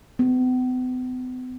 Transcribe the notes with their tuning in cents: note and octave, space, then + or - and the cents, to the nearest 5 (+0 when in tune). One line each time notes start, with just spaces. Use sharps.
B3 +45